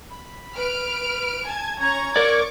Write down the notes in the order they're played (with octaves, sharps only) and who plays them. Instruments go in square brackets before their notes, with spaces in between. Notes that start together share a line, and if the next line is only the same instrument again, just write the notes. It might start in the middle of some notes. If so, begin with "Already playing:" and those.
[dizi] B5
[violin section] B4 F6 D7
G#5 A5 G#6
[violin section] C#4 A#5 C#6 [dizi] G#6
[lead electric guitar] A#4 D5 [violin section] C#6 D6